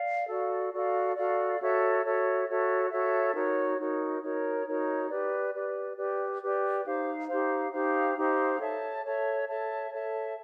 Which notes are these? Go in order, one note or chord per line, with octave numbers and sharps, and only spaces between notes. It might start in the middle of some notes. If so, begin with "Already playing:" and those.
Already playing: D5 F5
F#4 A4 D5 F5
F#4 A4 D5 F5
F#4 A4 D5 F5
F#4 A4 C#5 E5
F#4 A4 C#5 E5
F#4 A4 C#5 E5
F#4 A4 C#5 E5
D#4 F#4 A#4 C#5
D#4 F#4 A#4 C#5
D#4 F#4 A#4 C#5
D#4 F#4 A#4 C#5
G4 B4 D5
G4 B4 D5
G4 B4 D5
G4 B4 D5
D#4 G4 C5 F5
D#4 G4 C5 F5
D#4 G4 C5 F5
D#4 G4 C5 F5
A4 C#5 E5 A5
A4 C#5 E5 A5
A4 C#5 E5 A5
A4 C#5 E5 A5